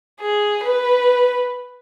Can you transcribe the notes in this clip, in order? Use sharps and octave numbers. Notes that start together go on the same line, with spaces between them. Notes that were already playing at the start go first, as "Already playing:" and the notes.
G#4
B4